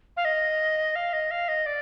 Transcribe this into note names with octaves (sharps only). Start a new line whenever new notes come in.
F5
D#5
F5
D#5
F5
D#5
D5